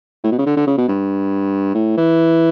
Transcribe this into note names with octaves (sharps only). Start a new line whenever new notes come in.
A2
B2
C#3
D3
D3
C#3
B2
G2
A2
E3